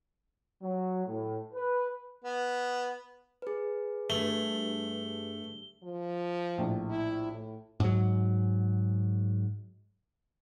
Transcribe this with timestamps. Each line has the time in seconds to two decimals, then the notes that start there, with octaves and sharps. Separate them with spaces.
0.62 F#3
1.06 A2
1.54 B4
2.24 B3
3.42 G#4 B4
4.10 G2 A3 G7
5.83 F3
6.58 A#1 A2
6.90 E4
7.32 A2
7.80 G#2 F#3